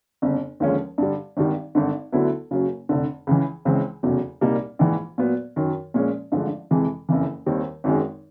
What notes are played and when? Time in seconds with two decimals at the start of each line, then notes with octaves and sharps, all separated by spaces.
0.22 G1 F2 C#3
0.60 D#2 D3 F3 G#3 C#4
0.98 G2 D3 G3
1.37 G#1 G2 D#3 G3
1.75 G#1 G2 D3
2.12 D2 D3 F#3 B3 E4
2.51 F#1 F#2 C#3 F#3
2.89 F1 F2 D3
3.27 C#2 C#3 E3
3.65 C#2 C#3 E3 G#3 C4
4.03 F1 E2 C#3 F#3
4.41 C2 A#2 G3 A#3 D#4
4.79 A#1 G#2 E3
5.18 A#2 F#3 B3
5.56 F#2 D#3 F#3
5.94 A#2 F3 G#3 C#4
6.32 A1 G2 D3 F3 G#3
6.71 F2 C3 E3 G#3
7.09 F#1 F2 C#3 E3
7.46 D#2 D#3 G3 C4
7.84 G#1 F#2 D#3 G#3